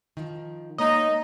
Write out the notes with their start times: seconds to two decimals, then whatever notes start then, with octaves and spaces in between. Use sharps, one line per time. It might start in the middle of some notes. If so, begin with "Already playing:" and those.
0.17 D#3 F3
0.78 G#3 A#3 D#4 C#5 D#5 A#5 D#7